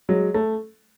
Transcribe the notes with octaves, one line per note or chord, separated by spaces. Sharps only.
F#3 G#3
A3